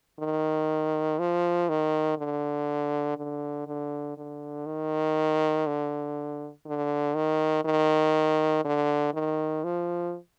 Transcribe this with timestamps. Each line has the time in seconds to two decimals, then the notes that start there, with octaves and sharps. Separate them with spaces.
0.20 D#3
1.19 F3
1.69 D#3
2.18 D3
3.17 D3
3.67 D3
4.18 D3
4.66 D#3
5.67 D3
6.66 D3
7.15 D#3
7.65 D#3
8.65 D3
9.14 D#3
9.64 F3